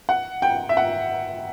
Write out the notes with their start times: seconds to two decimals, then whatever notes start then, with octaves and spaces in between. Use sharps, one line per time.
0.09 F#5
0.42 G5
0.69 E5
0.77 F#5